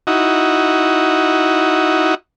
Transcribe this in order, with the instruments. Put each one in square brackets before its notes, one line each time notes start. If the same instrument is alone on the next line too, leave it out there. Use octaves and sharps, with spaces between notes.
[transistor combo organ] D#4 E4 F#4